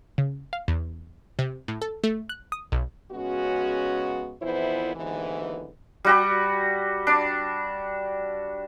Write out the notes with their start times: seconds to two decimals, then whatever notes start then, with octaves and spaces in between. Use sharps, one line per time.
0.18 C#3
0.53 F5
0.68 E2
1.39 C3
1.68 A2
1.82 A4
2.04 A3
2.29 F#6
2.52 D#6
2.72 B1
3.12 C#3 G#3 B3 C#4 F#4
4.42 F2 A#2 E3 B3 E4 C5
4.95 D#2 G#2 B2 D3 E3
6.05 G3 F#4 G4
7.07 D4